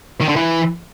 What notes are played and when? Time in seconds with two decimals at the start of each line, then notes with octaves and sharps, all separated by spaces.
0.21 D#3
0.28 D3
0.36 E3